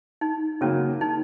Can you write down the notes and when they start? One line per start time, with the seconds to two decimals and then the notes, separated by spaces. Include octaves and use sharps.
0.21 D#4
0.61 C#3 F#3 A#3 C#4
1.01 D#4